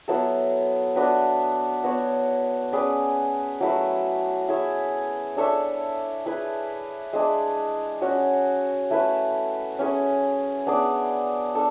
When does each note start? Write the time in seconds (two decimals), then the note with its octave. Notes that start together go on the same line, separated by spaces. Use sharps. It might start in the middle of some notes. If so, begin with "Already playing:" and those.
0.08 F#3 B3 E4 A4
0.96 B3 D4 F#4 B4
1.84 B3 F#4 C#5
2.73 C#4 G#4 B4 D5
3.61 F#3 A3 E4 B4
4.48 E4 G#4 C#5 E5
5.37 D4 A4 C#5 E5
6.26 E4 G#4 B4
7.13 G#3 D4 G#4 D5
8.01 C#4 F#4 C#5
8.90 A3 E4 B4
9.79 C#4 E4 G#4 C#5
10.67 B3 D4 G#4 D5
11.55 D4 A4